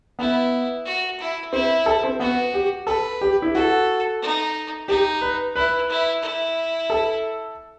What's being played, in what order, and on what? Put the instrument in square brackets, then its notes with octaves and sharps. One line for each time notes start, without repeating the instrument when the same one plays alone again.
[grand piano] B3 [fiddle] E4
[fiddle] F#4
E4
[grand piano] C4 [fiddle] E4
[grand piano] A4
C4
[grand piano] B3 [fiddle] F#4
[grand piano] G4
[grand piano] A4 [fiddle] B4
[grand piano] G4
E4
[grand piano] F#4 [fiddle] A4
[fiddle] D#4
[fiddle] D#4 [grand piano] G4
[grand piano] B4
[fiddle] E4 [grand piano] B4
[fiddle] E4
E4
[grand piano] A4